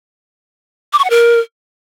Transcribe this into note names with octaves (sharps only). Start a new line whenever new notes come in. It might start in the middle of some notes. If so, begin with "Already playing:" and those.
D6
C#6
F#5
A#4